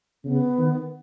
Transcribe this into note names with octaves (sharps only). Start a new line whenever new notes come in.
C#3 B3
D#3